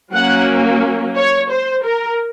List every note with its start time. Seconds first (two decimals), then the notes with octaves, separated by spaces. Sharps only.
0.12 F#3 A#3 C#4 F#5
1.16 C#5
1.50 C5
1.84 A#4